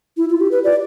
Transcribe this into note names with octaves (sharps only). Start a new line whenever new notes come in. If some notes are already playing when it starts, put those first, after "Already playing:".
E4
F4
G4
B4
D5